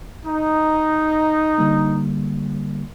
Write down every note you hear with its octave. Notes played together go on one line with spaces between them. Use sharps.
D#4
D3 G3 A#3